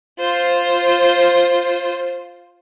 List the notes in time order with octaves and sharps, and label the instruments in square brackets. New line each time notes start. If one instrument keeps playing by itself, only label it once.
[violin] F4 C5